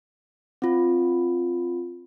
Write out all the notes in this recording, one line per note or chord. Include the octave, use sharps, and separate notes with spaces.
C4 F4